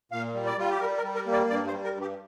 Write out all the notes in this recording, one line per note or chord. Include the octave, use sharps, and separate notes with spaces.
A#2 F5
G3
D5
G3 F4
G4
G3 A#4
A#4
G3
A#4
A#3
D5
G2 D5
C5
G3
A#4
G2
G4